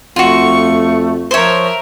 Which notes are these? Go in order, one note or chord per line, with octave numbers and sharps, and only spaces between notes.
F2 A3 F4 F#4 C#6
F3 A#4 C5 C#5 E5